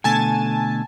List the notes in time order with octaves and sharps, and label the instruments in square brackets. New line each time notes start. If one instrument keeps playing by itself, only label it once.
[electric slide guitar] B2 D3 A3 [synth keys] G#5 A5